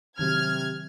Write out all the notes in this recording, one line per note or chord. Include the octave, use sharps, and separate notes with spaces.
C3 D#3 F#3 F6 G#6